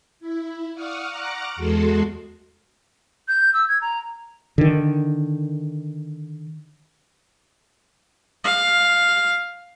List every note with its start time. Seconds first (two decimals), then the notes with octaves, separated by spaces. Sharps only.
0.20 E4
0.73 D5 F5 F#5 C#6 D#6 F6
1.09 F#5 A#5 C#6 D6 F6 F#6
1.56 E2 G#3 F#4 A4 C6
3.28 G6
3.54 E6
3.69 G#6
3.82 A#5
4.58 D3 D#3
8.44 F5